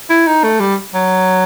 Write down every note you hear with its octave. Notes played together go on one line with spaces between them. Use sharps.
E4
D#4
A3
G3
F#3